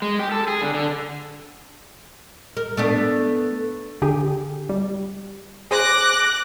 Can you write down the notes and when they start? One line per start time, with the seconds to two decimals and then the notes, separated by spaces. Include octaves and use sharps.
0.02 G#3
0.19 G4
0.32 A4
0.48 G#4
0.61 D3
0.75 D3
2.57 A#4
2.77 A3 B3 D4
4.02 D3 G4 G#4
4.69 G3
5.71 G#4 C5 D6 F#6 A#6